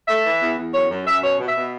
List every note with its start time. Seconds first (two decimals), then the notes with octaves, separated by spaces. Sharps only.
0.08 A3 E5
0.24 E3
0.41 E2
0.58 E2
0.74 F#2 C#5
0.90 F#2
1.06 F#2 E5
1.23 B2 C#5
1.39 B2
1.48 E5
1.56 B2